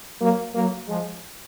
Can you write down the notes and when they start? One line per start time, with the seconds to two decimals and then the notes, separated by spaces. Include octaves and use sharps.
0.21 F#3 A#3
0.55 F#3 A#3
0.89 F3 G#3